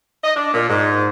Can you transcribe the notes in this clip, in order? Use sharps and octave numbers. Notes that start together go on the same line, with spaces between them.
D#5
D4
A#2
G#2